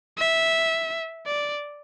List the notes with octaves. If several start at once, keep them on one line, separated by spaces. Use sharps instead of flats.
E5
D5